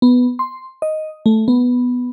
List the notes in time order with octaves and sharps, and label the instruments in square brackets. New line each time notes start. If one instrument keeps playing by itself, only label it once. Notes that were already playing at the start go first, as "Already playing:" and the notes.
[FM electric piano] B3
C6
D#5
A3
B3